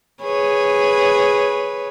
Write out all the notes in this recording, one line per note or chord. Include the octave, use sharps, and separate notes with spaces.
G#4 B4 C#5